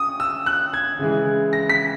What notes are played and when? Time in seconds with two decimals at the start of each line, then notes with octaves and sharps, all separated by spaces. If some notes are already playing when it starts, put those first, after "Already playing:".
Already playing: C#4 D#6
0.20 E6
0.46 F#6
0.73 G#6
0.99 C#3 E3 G#3
1.53 A#6
1.69 B6